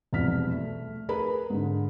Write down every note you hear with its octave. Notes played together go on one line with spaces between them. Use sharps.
E1 C2 F2 F6 B6
A3
G#4 A#4 B4 B5
G#2 D3